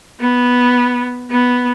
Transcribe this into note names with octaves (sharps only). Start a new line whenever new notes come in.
B3
B3